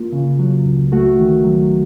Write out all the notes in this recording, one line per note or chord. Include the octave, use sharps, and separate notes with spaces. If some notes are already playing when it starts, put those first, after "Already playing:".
Already playing: A#3 F4
C#3
F#3
C#2
A3 F#4
D#3
F#3